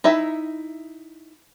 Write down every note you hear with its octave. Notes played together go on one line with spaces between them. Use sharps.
D#4 E4 E5